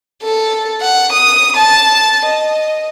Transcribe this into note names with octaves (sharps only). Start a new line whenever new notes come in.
A4
F#5
D#6
A5
D#5